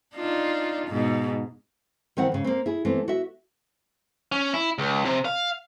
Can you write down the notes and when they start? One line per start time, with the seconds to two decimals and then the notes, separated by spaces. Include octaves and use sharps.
0.15 D4 D#4 F4
0.88 G#2 B2
2.17 D#3 E3 C4 E4 F#5
2.32 G#2 C#3
2.44 A#3 C4
2.66 E4 G#4
2.85 E3 A3 B3 C4
3.08 F#4 E5
4.32 C#4
4.54 E4
4.78 C#2
5.05 C3
5.25 F5